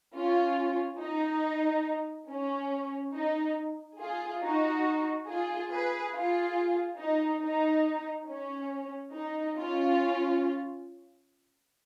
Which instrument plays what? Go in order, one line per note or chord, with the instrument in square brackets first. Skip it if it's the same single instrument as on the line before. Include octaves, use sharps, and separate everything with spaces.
[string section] C#4 F4
D#4
C#4
D#4
F4 G#4
D#4 F#4
F4 G#4
G#4 B4
F4 G#4
D#4
D#4
C#4
D#4
C#4 F4